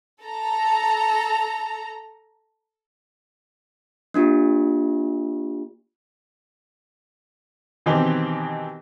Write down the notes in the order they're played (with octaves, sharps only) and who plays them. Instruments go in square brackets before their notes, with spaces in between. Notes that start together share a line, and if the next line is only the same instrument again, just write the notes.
[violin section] A4 A#5
[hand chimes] A#3 D4 F4 G4
[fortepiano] B2 D#3 E3 C4 D#4 G4